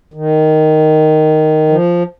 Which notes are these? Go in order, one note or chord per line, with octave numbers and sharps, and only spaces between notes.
D#3
F3